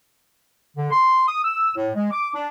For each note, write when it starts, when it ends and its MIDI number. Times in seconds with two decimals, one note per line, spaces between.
0.77 0.87 50
0.91 1.24 84
1.27 1.38 87
1.43 1.70 88
1.75 1.89 45
1.95 2.08 56
2.11 2.29 86
2.34 2.47 62